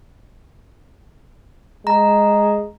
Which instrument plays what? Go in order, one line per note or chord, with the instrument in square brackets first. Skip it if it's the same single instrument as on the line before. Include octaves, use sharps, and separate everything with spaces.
[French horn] G#3 [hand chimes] A#5